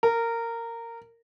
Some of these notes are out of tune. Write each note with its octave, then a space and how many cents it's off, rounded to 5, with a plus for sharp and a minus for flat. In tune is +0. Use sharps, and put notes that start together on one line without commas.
A#4 -15